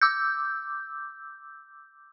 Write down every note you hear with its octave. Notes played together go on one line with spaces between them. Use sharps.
D6 E6 G6